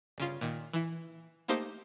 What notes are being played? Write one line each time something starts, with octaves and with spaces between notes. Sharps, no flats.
G1 C#3 F4
A#2 D#3
E3 E4
A3 A#3 D#4 G4 C5 D#5